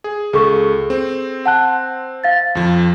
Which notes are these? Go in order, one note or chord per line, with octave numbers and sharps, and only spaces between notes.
G#4
C#2 G#4 A4 C#6
C4
F#5 A5 F#6
F5 A6
F2 F3